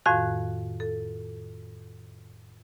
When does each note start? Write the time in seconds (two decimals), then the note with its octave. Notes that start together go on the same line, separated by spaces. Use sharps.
0.06 F2 A2 D#3 F#4 F5 F#6
0.80 A4